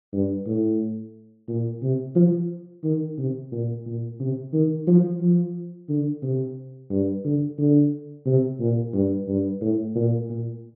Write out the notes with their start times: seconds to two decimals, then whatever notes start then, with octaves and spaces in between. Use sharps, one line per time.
0.13 G2
0.47 A2
1.48 A#2
1.83 C3
2.16 F3
2.84 D#3
3.18 C3
3.52 A#2
3.86 A#2
4.20 C3
4.53 D#3
4.87 F3
5.21 F3
5.89 D3
6.23 C3
6.91 G2
7.25 D3
7.58 D3
8.26 C3
8.60 A#2
8.94 G2
9.28 G2
9.62 A2
9.96 A#2
10.30 A#2